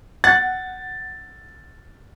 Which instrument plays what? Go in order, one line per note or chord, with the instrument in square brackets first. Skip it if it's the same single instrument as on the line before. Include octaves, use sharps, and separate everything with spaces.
[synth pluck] F#5 [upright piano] A6